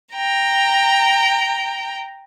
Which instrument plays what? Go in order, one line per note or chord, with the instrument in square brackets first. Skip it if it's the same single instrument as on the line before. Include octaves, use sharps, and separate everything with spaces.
[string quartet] G5 A#5